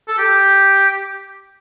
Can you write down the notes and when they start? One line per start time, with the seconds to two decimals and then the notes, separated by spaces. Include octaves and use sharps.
0.08 A4
0.18 G4